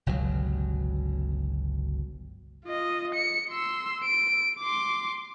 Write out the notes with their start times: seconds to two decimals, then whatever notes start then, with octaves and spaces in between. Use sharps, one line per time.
0.06 G1 C#2 B2 F#3
2.65 F4 D#5
3.15 C#7
3.51 C6 E6
4.04 D7
4.60 C6 D6